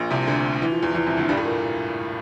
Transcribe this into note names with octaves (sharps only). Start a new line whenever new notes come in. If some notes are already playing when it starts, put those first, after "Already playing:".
Already playing: A#1 A#2
C2 C3
D2 D3
E3
F3
E2 E3
E2 E3
C2 C3
D2 D3
G2 G3
A2 A3
A#2 A#3